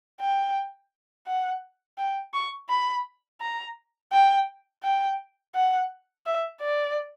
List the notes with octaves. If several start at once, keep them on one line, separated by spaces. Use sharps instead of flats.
G5
F#5
G5
C#6
B5
A#5
G5
G5
F#5
E5
D5